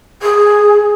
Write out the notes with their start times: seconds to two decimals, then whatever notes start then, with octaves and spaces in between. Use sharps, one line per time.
0.21 G#4